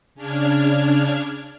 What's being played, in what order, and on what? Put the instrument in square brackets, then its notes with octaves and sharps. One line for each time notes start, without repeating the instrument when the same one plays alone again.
[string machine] C#3 D4 F6 G#6